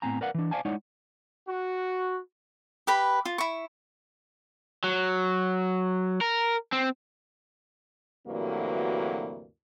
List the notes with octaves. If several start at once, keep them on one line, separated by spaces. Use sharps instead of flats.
A2 B3 C4 G#5 A#5
A#4 B4 D5 F5 F#5
E3 D4
C5 D5 F5 G#5 A5
G#3 D#4 E4 C#5 D5 F#5
F#4
G4 B4 B5
F4
E4 C#6
F#3
A#4
C4
D2 G2 C3 E3 F#3 A#3